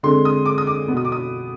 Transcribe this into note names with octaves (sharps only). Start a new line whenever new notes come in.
D3 G#3 C4 C6
D#6
D6
D#6
D6
B3
B2 D#6
D6
D#6